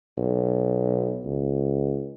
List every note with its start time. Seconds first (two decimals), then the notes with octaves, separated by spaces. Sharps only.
0.18 B1
1.25 C#2